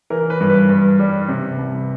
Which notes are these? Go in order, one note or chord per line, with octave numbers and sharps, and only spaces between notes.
E3 A#4
B4
G2
B4
G2
G3
C3
C2